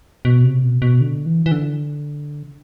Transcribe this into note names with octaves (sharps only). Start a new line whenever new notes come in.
B2
C3
B2
B2
D3
E3
E3
D3